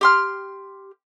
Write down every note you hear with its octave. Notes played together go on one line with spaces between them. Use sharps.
G4 C6 F6